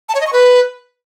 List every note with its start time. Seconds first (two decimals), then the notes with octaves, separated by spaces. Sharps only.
0.09 A5
0.15 C#5
0.21 D#5
0.27 C#6
0.33 B4